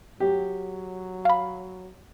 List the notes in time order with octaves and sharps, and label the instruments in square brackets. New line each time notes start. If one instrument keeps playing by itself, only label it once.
[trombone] F#3 [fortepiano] G4
[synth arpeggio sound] F5 B5